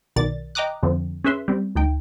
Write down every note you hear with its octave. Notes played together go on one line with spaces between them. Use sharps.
B1 B2 D#3 D5 A6
D#5 G5 A#5 D6 D#6 F#6
F2 D3 F3 C4
C#4 G#4 B4 E5 C6
G3 C4
D2 D#4 G5